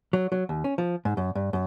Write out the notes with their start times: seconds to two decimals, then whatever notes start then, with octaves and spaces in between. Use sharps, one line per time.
0.13 F#3
0.32 F#3
0.49 D#2
0.64 C#4
0.78 F3
1.05 G#2
1.17 F#2
1.35 G2
1.53 F#2